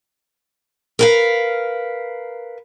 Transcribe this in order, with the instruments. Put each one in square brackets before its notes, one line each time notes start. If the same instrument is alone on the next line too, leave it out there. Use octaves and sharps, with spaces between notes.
[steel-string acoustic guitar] A#4 B4 F5